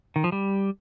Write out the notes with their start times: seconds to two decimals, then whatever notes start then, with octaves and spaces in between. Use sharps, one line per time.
0.16 D#3
0.24 F3
0.32 G3